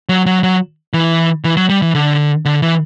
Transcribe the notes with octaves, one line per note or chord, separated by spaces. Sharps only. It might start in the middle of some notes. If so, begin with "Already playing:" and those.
F#3
F#3
F#3
E3
E3
F#3
G3
E3
D3
D3
E3